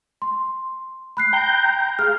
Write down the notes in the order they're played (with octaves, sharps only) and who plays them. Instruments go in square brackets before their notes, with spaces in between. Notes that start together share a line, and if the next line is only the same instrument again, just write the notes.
[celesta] C6
B5 F#6 C7
[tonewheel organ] G5 A#5 G6
[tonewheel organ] G#4 F5 [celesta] F6